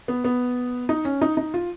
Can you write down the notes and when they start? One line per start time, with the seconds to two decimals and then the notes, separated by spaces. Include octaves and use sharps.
0.08 B3
0.24 B3
0.89 D#4
1.05 C#4
1.21 D#4
1.37 D#4
1.54 F4